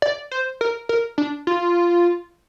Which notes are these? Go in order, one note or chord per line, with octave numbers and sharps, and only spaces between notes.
D5
C5
A#4
A#4
D4
F4